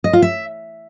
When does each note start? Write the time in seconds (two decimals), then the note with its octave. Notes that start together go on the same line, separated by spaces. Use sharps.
0.04 D#5
0.13 F4
0.22 E5